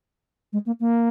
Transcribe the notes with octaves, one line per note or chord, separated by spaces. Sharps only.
G#3
A#3
A#3